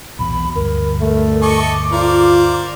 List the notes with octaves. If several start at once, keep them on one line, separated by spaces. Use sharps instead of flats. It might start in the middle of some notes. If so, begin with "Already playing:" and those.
B1 E2 B2 B5
D2 G2 A#4
A3
A4 D#5 C#6 D6
F4 A#4 C5 D5